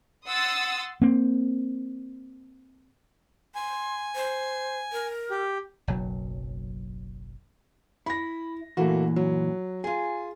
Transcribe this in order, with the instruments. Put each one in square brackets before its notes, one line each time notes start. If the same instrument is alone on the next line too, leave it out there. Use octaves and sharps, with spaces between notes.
[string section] F#5 C6 D#6 E6 A6
[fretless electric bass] A#3 C4
[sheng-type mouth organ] G#5 [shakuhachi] C6
[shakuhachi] C5
A#4
[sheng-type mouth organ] G4
[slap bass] F#1 B1 F#3
[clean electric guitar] E4 [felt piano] B5 A#6
[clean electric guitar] F#2 A#2 E3 [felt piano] A3 A#3 F#4
[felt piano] F#3
[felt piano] F4 G#5 [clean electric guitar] G#4